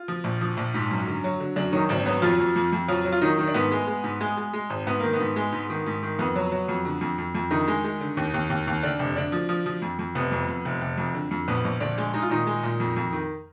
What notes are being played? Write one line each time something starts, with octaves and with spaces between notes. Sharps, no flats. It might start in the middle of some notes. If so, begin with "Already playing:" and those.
Already playing: F4
F3
A#1
F3
A#1
G#2
F#2
D3
F#3
D3
F#2 D3 D4
D#3 F#3 D#4
G#1 D3 D4
F#3 B3
F2 F3 F4
F2
F2
F2
F3 F#3 F4
F#3
F4
D#3 F#3 D#4
D#3 D#4
D4
G#2 B3
G#3
G#3
G#2
G#3
G#3
G#3
G#1
G#2 B3
D#3 A#3
B3
G#2
G#3
G#2
D#3
G#2
D#3
F2 B3
F#3
F#3
F2
D3
F2
F2
F2
D3 D#3 D#4
G#3
G#3
D3
D#2
D#2
D#2
D#2
D3 D4
F1
D3 D4
F3
F3
F3
F2
F2
F1 B3
F2
F2
F1
F1
F2
D3
F2
A#1 B3
A#1
A#1 D3 D4
G#3
G#3 D#4
F4
A#2 D#3 D#4
G#3
A#2
F2
F2
D#3